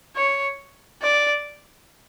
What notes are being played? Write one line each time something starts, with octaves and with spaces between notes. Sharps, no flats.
C#5
D5